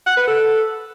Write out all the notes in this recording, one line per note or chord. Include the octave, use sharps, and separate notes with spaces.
F#5
B4
A4